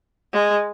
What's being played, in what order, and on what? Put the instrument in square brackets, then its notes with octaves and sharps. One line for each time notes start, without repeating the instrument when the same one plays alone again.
[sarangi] G#3